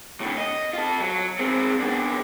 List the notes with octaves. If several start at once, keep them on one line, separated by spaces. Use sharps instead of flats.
A2 D3
D#5
F4 A4
F#3
G#3 C4
B2 D4